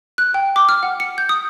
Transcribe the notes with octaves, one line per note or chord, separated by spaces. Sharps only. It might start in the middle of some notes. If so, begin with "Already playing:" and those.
F#6
G5
D6
F6
F#5
C#7
G6
D#6